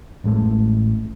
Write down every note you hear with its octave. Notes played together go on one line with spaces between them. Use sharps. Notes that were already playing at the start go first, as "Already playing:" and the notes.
A1 A2 G#3 A3